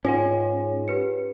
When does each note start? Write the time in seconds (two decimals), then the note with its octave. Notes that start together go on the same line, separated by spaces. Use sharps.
0.05 G#2 C#4 F4 C#5 F#5 G#5
0.88 G4 B4 C#7